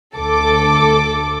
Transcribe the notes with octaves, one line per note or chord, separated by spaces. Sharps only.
D2 A4 D6